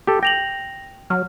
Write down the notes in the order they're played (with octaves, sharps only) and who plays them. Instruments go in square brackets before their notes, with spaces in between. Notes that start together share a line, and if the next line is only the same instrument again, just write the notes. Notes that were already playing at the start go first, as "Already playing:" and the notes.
[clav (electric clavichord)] G4 A4
[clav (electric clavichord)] G5 [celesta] A#6 F7 F#7
[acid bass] F#3 [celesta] F6